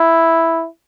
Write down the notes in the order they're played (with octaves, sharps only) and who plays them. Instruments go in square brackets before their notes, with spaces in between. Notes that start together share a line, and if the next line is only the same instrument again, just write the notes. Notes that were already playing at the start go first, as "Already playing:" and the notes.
Already playing: [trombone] E4